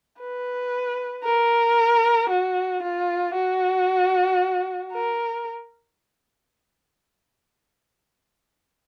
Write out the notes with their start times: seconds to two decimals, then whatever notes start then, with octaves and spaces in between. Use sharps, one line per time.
0.20 B4
1.24 A#4
2.30 F#4
2.83 F4
3.35 F#4
4.93 A#4